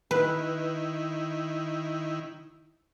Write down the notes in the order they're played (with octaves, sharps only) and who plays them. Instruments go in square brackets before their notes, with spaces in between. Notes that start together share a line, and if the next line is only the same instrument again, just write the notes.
[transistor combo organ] D#3 E4 [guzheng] B4